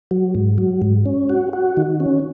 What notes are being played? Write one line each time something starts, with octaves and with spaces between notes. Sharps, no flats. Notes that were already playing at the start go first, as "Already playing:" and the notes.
F#3
G#2
F#3
G#2
C#4
F#4
F#4
D#3
C#4